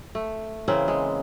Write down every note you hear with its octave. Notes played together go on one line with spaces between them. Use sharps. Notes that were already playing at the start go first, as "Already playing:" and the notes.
A3
C#3 E3 A#3 C4
G#3